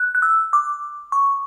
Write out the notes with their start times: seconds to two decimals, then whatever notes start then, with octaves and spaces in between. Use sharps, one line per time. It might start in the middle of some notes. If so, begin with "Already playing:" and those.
Already playing: F#6
0.15 F#6
0.22 E6
0.53 D6
1.12 C#6